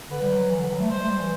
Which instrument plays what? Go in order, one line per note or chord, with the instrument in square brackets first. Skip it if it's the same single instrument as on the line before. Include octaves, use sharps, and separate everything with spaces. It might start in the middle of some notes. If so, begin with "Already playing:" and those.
[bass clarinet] D3 [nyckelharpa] B4
[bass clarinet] G3
F#3
E3
D3
F#3
A3
[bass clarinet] G3 [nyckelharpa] C5
[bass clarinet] A3
G3
E3